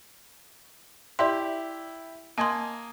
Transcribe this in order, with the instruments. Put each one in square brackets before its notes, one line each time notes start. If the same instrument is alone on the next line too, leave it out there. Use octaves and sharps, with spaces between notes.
[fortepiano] E4 G4 [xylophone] D5 E5 C6
[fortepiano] A#3 D#5 G#5 [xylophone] A5 C6